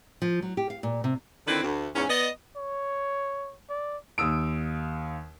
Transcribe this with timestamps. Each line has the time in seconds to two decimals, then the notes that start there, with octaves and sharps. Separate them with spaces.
0.22 F3
0.42 F#3
0.57 G4
0.70 F5
0.83 A#2
1.04 C3
1.47 D3 D#3 C4 E4 B4
1.63 D2
1.95 E2 G#2 C#4
2.09 B3 D5 D#5
2.56 C#5
3.69 D5
4.18 D#2 D#6 E6 D7